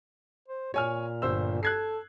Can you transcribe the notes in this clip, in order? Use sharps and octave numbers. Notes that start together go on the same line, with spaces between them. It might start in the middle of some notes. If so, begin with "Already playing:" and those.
C5
A#2 C#5 G#5 F6
G1 C5 E6
A4 F#6 G#6 C7